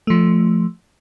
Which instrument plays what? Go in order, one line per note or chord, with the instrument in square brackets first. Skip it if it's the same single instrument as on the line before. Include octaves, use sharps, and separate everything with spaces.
[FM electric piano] F3 A3